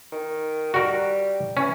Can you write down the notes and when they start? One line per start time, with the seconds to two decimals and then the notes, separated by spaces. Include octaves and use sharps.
0.12 D#3
0.74 G3 F#4 A#4
1.57 E3 C#4